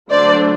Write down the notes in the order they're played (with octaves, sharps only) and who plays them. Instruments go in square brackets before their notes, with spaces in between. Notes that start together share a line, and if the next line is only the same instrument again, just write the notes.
[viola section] D3 F#3 A3 D4 C5 D5